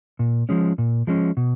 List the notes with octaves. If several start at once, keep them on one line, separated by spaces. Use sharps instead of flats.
A#2
F3 G#3 C#4
A#2
F3 G#3 C#4
B2